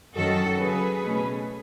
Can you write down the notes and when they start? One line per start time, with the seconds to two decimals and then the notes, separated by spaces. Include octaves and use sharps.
0.15 F#2 D#3 F#3 C#4 F#4 A4
0.59 C#3 F#3 B3 G#4 B4
1.02 B2 A3 C#4